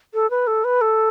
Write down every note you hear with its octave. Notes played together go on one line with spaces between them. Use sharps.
A4
B4
A4
B4
A4